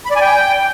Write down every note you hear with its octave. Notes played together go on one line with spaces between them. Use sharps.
B5
D5
G#5
G5